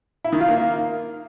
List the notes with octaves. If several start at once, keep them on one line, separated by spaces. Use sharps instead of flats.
E4
D#3
F4
A#3